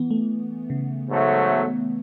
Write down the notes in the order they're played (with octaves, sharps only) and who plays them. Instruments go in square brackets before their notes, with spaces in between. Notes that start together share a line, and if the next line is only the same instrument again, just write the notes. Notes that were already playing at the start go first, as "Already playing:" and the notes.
Already playing: [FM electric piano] E3 B3
A3
C#3
[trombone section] G#2 F#3 A3